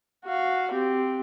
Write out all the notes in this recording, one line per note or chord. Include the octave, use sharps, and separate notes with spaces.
F#4 F5
C4 G4